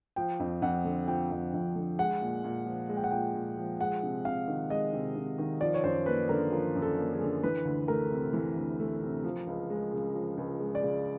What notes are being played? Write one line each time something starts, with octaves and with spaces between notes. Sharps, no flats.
F3 G5
F2
F2 F#5
D3
F3 G5
F2
F2
D3
G#3 F#5
A#2
A#2
F3
G#3
G5
F#5
A#2 G5
A#2
F3
G#3 F#5
C3
C3 F5
D#3
G#3 D#5
C3
C3
D#3
F3 D5
C#5
F#2 C5
A#3 B4
D3 A#4
F3 A#4
F#2
A4
A#3
G#4
D3
E3 B4
D2
A3 A#4
C3
E3
D2
A3
C3
F3
C#2
G#3
C#3
F3
C#2
G#3
D5
C#3